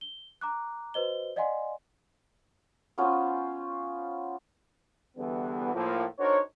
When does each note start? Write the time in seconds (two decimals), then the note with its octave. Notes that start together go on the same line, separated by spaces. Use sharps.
0.01 G7
0.41 A#5 D6 F#6
0.94 F#4 B4 C5 D#5 G7
1.36 D5 D#5 F5 F#5 G#5 C6
2.98 B3 C#4 F4 C5
5.17 E2 D3 E3 G3 B3
5.74 A2 F3 A#3
6.19 D4 D#4 F#4 A#4 C5 C#5